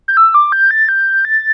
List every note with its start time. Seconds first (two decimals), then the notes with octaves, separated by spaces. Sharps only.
0.08 G6
0.17 E6
0.34 D6
0.52 G6
0.71 A6
0.89 G6
1.25 A6